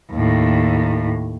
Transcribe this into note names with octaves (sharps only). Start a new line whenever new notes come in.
D#2 A2